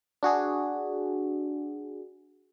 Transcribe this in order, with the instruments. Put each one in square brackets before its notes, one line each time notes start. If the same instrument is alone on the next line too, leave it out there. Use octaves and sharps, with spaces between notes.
[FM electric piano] D4 F#4 G#4